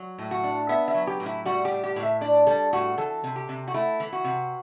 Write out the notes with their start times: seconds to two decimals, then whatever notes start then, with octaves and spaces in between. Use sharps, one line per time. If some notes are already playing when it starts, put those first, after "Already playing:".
Already playing: F#3
0.18 A2
0.31 F#4
0.44 D4
0.69 B3 E5
0.88 E5
0.94 F#3
1.07 G4
1.20 A2
1.26 E4
1.45 G3 F#4
1.65 G4
1.71 A2
1.83 G4
1.96 A2
2.03 E5
2.21 D4 D5
2.47 G3 A4
2.73 A2 F#4
2.98 E3 A4
3.24 C3
3.36 G4
3.49 C3
3.68 F#4
3.74 A3 E4
4.00 E3
4.13 F#4
4.24 C3